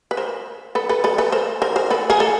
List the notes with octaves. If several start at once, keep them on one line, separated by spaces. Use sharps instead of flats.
B4
A#4 C5
A4 B4
A4 B4
A4 B4
A4 B4
A#4 C5
A#4 C5
A#4 C5
A4 B4
G#4 A#4
A4